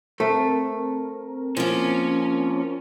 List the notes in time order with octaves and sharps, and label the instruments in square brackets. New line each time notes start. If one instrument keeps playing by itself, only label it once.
[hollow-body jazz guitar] A3 [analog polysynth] C4 A#4
[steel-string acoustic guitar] F3 A#3 [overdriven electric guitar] C#4